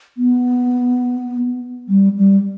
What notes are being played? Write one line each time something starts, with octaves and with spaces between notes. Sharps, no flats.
B3
G3
G3